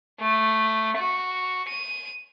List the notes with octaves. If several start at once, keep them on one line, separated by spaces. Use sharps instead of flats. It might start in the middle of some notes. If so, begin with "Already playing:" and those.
A3
F#4
D#7